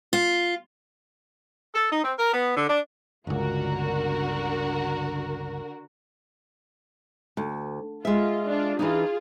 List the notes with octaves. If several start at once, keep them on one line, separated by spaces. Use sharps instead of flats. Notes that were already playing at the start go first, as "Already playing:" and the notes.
F4
A4
D#4
C4
A#4
B3
D3
D4
G1 C#2 D3 F#4 A#4
D2
G#3 F4 E5
D4 F4
E3 D4 D#4 F4 G#4